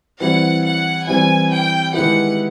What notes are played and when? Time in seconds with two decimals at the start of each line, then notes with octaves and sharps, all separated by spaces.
0.20 E3 G3 C4 E4 F#5
0.64 F#5
1.07 E3 G3 C4 E4 G#5
1.51 G5
1.94 D#3 G#3 B3 E4 G4 F#5